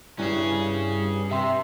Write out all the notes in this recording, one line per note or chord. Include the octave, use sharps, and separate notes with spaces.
G2 C#4 E4 G#4
C3 E5 C6